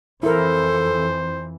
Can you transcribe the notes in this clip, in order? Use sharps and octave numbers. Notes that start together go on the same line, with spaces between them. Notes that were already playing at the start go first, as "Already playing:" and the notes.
F2 E3 E4 A4 A#4 C5